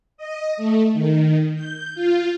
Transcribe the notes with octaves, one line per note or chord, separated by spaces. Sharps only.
D#5
A3
D#3
G6
F4